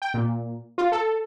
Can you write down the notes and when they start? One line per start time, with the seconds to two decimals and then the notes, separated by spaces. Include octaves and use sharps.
0.02 G5
0.14 A#2
0.78 F4
0.92 A4